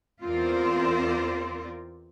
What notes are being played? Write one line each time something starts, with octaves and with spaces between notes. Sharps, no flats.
E2 C4 F4 A#4 C5 D5